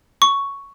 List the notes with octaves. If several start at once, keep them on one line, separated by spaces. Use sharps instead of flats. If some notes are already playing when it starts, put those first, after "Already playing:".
C#6